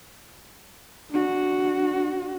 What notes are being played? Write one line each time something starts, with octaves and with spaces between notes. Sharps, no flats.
D4 F#4